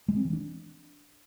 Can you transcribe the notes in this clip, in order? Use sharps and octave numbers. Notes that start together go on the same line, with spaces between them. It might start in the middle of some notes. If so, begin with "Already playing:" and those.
G#3
C4
E3
D4